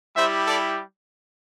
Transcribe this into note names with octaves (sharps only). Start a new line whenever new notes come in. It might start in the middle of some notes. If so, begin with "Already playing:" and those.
G3 E4 G4 C5 E5
A4 D5